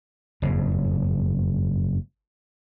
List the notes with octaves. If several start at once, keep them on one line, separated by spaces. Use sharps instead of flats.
F#1 F2 G#2